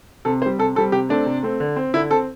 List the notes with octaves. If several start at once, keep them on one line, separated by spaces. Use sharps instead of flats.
C3 A4
G3 C4 C5
C3 A4
G3 C4 A4
C3 G4
A3 C4 D4
C3
A3 C4
D3
C4
D3 E4
C4 A4